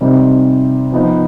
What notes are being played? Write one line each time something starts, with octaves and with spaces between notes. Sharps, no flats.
C3 G3 C4 D#4
F3 B3 D#4